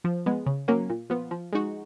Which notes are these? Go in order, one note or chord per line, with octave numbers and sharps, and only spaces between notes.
F3
G#3 B3
C#3
F#3 A#3 C#4
A#2
F3 B3 F4
F3
G#3 D#4 F#4